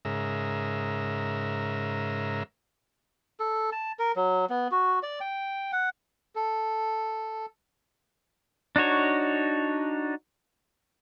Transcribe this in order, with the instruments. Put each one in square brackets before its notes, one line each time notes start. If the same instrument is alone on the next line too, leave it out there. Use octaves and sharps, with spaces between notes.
[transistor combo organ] G#2 C#3 A#4 E5
[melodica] A4
A5
A#4
F#3
B3
F#4
D5
G5
F#5
A4
[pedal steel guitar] D4 D#4 F#4 C#5